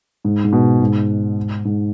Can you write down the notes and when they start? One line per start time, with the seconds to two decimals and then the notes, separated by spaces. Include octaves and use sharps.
0.25 G#2
0.44 G#2
0.53 B2
0.80 G#2
1.65 G#2